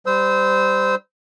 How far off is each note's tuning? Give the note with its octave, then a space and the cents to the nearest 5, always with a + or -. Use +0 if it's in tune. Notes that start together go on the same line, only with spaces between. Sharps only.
G3 +0 C5 -20 E6 -30